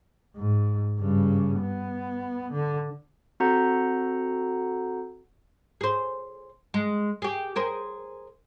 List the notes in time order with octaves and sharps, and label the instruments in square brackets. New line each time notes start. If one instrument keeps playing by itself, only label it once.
[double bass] G#2
G2 C#3
B3
D3
[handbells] C4 F#4 A4 F#5 A#5 G6
[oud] G#4 C5
G#3
G4 G#4
G#4 A#4 C5